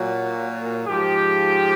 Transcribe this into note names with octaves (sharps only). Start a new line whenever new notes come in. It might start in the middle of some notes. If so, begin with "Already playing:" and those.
Already playing: A#2 F#3
G#2 F3 G4